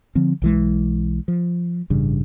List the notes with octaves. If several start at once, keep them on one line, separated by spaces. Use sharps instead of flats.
D3 F3 C4
B1 E3 G#3
F3
A1 G2 C#3